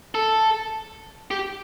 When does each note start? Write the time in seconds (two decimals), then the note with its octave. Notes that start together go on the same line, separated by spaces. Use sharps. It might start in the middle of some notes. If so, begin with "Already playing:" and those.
0.15 A4
1.31 G4